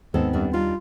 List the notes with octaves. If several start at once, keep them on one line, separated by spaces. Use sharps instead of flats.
D#2 G#2 G#3 B3 C4 A4
F#2 G3 D4
G3 D4 D#4 F4